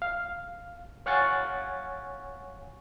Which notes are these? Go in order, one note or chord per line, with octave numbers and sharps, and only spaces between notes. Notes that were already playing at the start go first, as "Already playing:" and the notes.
F5
C#5 F5 F#5 G#5 C#6 A6